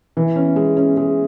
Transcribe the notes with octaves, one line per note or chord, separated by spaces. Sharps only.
E3
C#4
G#3
C#4
G#3